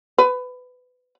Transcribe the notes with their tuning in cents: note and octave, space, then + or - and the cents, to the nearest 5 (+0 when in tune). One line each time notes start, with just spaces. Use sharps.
B4 +20